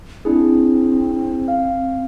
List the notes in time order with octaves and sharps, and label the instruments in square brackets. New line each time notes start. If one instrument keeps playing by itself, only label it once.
[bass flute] C4 [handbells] D4 E4 G#4
[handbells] F5